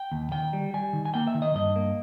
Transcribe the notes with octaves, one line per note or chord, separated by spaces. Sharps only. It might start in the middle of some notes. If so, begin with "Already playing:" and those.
Already playing: G5
D#2
D#3 G5
G3
G3 G#5
D#3
G#5
A#3 G5
E5
D#3
D#5
G2 D#5
A#3